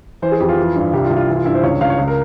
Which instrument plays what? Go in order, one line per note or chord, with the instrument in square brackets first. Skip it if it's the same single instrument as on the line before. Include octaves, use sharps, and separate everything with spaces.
[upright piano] E3 C5
G#4
F2 G4
F4
E3
G2
C2 G4
F4
C2
F4
E3 E4
F4
G2 E4
C5
C#2 C#5
C#2 F5
C#5
C#2
A#4